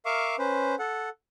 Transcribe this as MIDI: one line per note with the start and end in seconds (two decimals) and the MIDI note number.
0.06 0.36 70
0.06 0.36 76
0.06 0.36 77
0.06 0.36 85
0.06 0.36 86
0.39 0.75 61
0.39 0.75 71
0.39 0.75 72
0.79 1.09 69
0.79 1.09 78